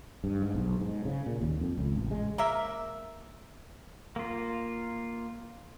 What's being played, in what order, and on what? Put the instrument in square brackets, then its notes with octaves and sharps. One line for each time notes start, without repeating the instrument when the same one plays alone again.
[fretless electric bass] G2
G#2
B1
G#2
C#3
A#2
D#2
F2
C#2
A1
G#3
[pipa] A#3 A#4 E5
[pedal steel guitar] A#3 F4